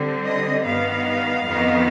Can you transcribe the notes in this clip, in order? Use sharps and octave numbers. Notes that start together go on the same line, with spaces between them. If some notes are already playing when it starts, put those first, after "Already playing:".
Already playing: D3 G3 C4
D#5
G2 D#3 B3 F5
F2 D#3 B3